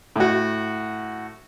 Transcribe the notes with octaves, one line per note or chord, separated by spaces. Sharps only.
A2 F#4